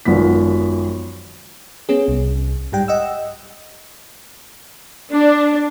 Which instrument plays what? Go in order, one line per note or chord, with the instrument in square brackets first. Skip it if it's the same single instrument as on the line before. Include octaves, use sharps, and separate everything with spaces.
[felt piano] G#1 F#2 F3 B3 B6
[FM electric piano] B3 C#4 G#4
C2
G#2 G3 G5
D#5 F#5 E6
[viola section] D4